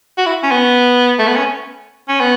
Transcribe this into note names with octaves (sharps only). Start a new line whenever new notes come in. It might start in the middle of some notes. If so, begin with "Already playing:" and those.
F#4
E4
C#4
B3
A3
B3
C#4
C#4
B3